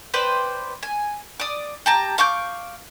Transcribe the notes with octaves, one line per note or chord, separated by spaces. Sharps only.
B4 C5 D5 G5
G#5
D5 D#6
G4 A5 A#5
F5 C#6 D6 G6